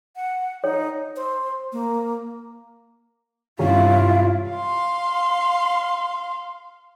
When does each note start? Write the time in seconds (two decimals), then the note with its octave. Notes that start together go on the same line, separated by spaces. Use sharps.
0.16 F#5
0.64 D#4 C#5
1.16 C5
1.73 A#3
3.59 G2 C3 E3 C#4 E4 F4 F5
4.51 F5 C6